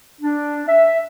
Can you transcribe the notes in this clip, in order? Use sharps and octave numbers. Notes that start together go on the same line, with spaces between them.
D4
E5